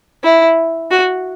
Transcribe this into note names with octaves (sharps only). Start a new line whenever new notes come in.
E4
F#4